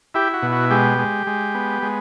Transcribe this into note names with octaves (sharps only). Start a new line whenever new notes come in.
E4 G4
F#4
B2
F#4
G#3 G4
G#3
G#3
B3
G#3